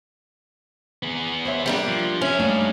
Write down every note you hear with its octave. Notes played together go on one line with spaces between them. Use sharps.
B3 G#4
C5 C#5 E5
G3 A#3 D4
F3
F2 C#4 E5
G3 A3 A#3 D4 D#4